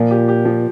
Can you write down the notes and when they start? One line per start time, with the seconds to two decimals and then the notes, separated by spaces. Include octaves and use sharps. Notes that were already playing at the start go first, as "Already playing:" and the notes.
Already playing: A#2 F3
0.11 G4
0.28 G4
0.45 F3